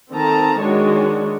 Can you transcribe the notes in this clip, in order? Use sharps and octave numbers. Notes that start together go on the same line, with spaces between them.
D#3 C4 A4 A5 A#5
D#3 G#3 D4 F#4 C#5